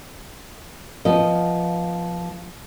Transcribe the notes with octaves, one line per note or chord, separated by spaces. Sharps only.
F3 B3 D#5